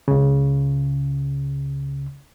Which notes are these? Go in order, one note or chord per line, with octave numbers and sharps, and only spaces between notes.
C#2 C#3